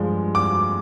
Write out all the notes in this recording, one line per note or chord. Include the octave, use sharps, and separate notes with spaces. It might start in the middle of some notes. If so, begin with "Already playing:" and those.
Already playing: G2 F3 G#3
D6